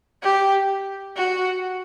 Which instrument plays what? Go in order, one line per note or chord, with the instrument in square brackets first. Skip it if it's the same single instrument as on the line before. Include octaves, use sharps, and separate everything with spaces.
[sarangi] G4
F#4